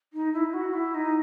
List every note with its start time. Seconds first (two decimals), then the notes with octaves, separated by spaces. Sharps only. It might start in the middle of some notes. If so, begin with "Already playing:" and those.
0.13 D#4
0.33 E4
0.53 F#4
0.73 E4
0.94 D#4